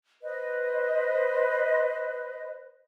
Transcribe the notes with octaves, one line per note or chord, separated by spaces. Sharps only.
B4 C5 D#5